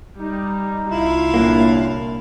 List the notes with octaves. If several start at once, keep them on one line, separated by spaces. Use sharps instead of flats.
G3 D#4
C2 E4 F4 F5
F#2 A#2 A#3 D4